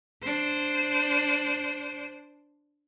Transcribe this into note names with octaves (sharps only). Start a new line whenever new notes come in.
D4 C5